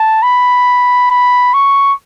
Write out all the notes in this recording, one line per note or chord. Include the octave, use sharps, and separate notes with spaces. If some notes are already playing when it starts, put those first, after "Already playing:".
Already playing: A5
B5
B5
C#6